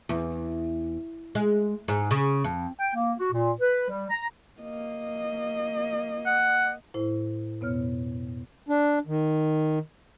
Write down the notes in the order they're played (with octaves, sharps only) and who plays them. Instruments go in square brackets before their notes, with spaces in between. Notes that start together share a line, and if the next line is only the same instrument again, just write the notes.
[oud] E2
G#3
G#2
C#3
F2
[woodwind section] G5
A#3
F#4
A#2
B4
G3
A#5
[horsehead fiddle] A#3 D#5
[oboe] F#5
[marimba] A2 E4 C5
F2 B2 B3 C#5 F6
[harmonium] D4
D#3